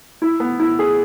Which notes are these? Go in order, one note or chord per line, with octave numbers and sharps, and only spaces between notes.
E4
B3
E4
G#4